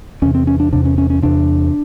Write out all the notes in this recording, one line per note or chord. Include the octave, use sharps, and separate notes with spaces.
E2 C3 C#4
C4
C#4
D4
E2 C3 D4
C#4
C#4
C#4
E2 C3 D4